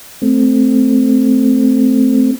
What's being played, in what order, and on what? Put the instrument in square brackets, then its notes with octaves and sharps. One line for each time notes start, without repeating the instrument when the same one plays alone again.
[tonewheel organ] A3 C4